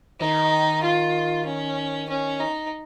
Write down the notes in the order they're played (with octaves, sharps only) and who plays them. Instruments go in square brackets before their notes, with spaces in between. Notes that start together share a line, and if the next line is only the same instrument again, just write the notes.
[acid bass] D#3 [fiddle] D#4
[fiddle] F4
C#4
C#4
D#4